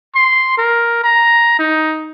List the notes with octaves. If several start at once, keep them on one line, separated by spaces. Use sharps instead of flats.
C6
A#4
A#5
D#4